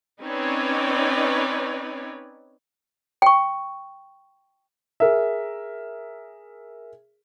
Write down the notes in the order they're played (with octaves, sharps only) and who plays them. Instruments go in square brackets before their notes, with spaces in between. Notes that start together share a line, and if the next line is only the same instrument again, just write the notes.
[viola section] C4 C#4 D#4 B4 C#5 D5
[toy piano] G5 C#6
[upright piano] G#4 A#4 E5